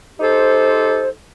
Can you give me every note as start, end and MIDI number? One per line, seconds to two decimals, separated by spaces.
0.20 1.08 63
0.20 1.08 67
0.20 1.08 69
0.20 1.08 72